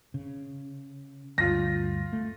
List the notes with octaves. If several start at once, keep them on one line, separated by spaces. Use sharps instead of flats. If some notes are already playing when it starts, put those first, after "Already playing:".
C#3
D2 G2 F4 A#6
A3